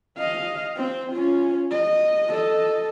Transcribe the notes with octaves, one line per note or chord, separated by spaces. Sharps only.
D#5 F5
C4
C#4 F4
D#5
A4 D#5